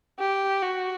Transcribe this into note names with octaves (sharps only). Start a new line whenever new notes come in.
G4
F#4